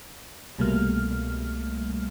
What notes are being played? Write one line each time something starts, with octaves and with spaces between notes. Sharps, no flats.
C2 B2 G3 A3 A#3 F6